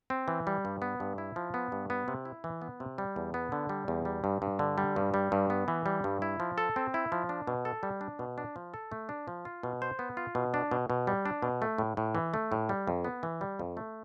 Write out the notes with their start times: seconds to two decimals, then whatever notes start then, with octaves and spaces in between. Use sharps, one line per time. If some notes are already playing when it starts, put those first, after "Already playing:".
0.10 C4
0.28 E3
0.47 G3
0.65 G2
0.82 B3
1.00 G2
1.18 E4
1.36 F3
1.54 B3
1.72 G2
1.90 B3
2.08 C3
2.25 E4
2.44 E3
2.62 B3
2.80 C3
2.98 G3
3.16 E2
3.34 B3
3.52 D3
3.69 G3
3.88 E2
4.05 G3
4.24 G2
4.42 G2
4.59 D3
4.78 G3
4.96 G2
5.14 G3
5.32 G2
5.50 B3
5.68 E3
5.86 G3
6.04 G2
6.22 E4
6.40 F3
6.58 A4
6.76 C4
6.94 E4
7.12 F3
7.29 D4
7.47 B2
7.65 A4
7.83 G3
8.01 D4
8.19 B2
8.38 D4
8.56 F3
8.74 A4
8.92 A3
9.09 D4
9.28 F3
9.45 F4
9.63 B2
9.82 C5
9.99 B3
10.17 F4
10.35 B2
10.54 D4
10.71 B2
10.90 B2
11.07 G3
11.26 D4
11.42 B2
11.62 A3
11.78 A2
11.97 A2
12.15 E3
12.34 A3
12.52 A2
12.69 G3
12.87 F2
13.04 B3
13.23 E3
13.41 G3
13.59 F2
13.77 A3